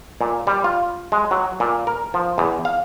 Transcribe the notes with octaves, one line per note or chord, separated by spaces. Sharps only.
A#2
G3
F4
G#3
F#3
A#2
A#4
F3
E2
F5